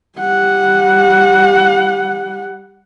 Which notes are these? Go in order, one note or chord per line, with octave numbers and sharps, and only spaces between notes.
G3 F#5